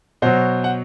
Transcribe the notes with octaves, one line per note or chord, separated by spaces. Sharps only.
B2 F#3 C5
F#5